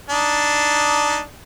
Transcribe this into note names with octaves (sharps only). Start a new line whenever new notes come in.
D4 D#4